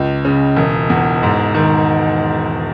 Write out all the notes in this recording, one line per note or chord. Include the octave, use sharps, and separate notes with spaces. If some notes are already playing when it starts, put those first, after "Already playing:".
Already playing: C#2
C#3
E1
E2
G#2
D#3